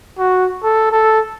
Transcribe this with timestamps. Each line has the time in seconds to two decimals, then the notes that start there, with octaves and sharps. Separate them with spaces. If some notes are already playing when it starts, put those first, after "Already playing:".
0.19 F#4
0.63 A4
0.92 A4